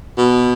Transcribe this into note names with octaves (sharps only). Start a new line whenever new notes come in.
B2